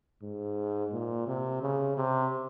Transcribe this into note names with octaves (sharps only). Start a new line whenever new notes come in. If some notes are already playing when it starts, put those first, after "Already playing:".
G#2
A#2
C3
C#3
C3